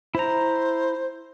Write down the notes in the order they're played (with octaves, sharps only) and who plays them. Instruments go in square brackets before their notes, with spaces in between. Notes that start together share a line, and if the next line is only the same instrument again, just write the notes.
[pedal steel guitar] E4 A#5 [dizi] C5